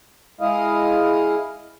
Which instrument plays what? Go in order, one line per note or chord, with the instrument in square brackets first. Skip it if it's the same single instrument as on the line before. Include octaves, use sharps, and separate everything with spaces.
[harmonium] G#3 E4 D#5 F5